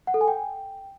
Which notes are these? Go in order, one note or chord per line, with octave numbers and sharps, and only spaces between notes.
F#5
A4
G#5
G5